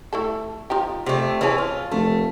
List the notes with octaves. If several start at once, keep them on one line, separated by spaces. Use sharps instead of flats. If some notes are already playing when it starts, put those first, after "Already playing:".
A3 E4 A4
F3 D#4 G4
C3 A3
E3 C4 C#4 G#4 A5
F4
F1 A3